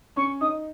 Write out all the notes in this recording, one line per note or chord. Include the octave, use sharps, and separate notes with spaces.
C#4 C#6
D#4 D#6